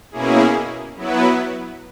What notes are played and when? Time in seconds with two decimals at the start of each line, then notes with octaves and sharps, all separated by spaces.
0.12 B2 A#3 C#4 E4 G#4
0.96 F#3 B3 E4 B4